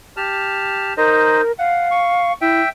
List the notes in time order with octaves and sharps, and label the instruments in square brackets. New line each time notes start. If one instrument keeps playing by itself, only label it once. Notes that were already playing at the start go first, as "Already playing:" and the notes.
[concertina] G4 A5 F6
[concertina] D#4 C5 D#5 [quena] A#4
[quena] F5 [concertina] F#5
[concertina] C#6
[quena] E4 [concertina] E5 G5